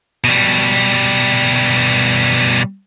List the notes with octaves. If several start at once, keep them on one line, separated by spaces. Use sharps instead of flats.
B2 G3